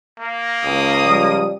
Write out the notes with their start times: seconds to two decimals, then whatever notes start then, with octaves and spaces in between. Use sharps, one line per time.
0.20 A#3
0.63 C#2 D#6
1.04 F3 G3 D5